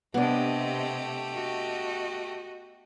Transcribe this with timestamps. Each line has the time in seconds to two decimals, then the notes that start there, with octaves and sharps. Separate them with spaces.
0.14 C3 A3 B3 D4 G4 D#5
1.33 F#4 D#5